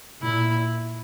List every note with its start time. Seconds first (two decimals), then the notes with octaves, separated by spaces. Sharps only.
0.22 A#2 E4